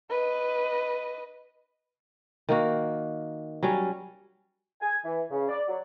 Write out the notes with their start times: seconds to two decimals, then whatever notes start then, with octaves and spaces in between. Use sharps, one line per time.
0.10 B4 D#5
2.49 D#3 A#3 F#4
3.63 F#3 G3 C#4
4.81 G#5
5.04 E3
5.31 C#3
5.49 D5
5.68 F#3